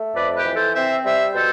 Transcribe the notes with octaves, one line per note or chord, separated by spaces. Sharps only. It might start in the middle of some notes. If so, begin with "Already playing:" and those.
Already playing: A3
F2 B4 D5
G4 B4
E3
A4 C5
C4 C5 E5
G3 C5 E5
B2 A4 C5